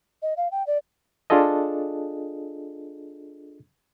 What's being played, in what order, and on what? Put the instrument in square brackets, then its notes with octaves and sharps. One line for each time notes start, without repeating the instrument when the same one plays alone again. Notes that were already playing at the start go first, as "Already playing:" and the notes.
[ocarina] D#5
F5
G5
D5
[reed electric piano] D4 F4 G#4 A4 D#5